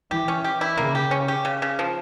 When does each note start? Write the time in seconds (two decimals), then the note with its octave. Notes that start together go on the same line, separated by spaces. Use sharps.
0.11 E3 G4
0.28 C#4
0.44 G4
0.61 E4
0.77 C#3 A#3
0.95 G4
1.11 C#4
1.28 G4
1.45 C#3
1.62 C#3
1.79 F3